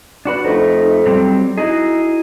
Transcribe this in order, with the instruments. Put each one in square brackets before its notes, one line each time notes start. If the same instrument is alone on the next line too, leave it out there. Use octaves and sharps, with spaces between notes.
[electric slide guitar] D4 F#4 B4
[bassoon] F2 [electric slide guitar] A3 D#4
[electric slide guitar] F#3 G3 C4
[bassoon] D#4 [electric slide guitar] E4 F#4 G#4